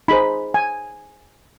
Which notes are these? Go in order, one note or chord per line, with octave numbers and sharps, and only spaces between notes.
D#4 G#4 C5 B5
G#5